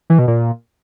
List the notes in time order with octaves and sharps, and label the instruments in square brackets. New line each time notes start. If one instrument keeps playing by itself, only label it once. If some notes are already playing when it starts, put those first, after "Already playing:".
[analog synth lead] E3
B2
A#2